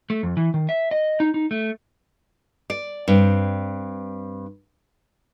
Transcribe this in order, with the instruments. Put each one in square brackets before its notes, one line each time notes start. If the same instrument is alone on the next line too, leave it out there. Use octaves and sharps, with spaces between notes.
[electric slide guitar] A3
F2
E3
D#3
E5
D#5
D#4
D#4
A3
[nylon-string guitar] D5
G2 C4